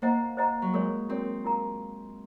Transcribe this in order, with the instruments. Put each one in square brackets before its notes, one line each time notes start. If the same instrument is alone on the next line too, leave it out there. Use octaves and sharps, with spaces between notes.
[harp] A#3 [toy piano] C5 D#5 F#5 A#5
[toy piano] C5 D#5 F#5 A#5
[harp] F#3
[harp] G#3 [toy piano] F#4 A#4 C#5
[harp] C4 [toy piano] F#4 A#4 C#5
[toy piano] F4 A#4 F5 A#5